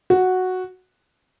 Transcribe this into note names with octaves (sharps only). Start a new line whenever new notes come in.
F#4